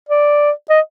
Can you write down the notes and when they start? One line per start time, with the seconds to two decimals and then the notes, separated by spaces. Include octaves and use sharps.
0.09 D5
0.70 D#5